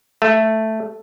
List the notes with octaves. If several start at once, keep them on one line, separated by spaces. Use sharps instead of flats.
A3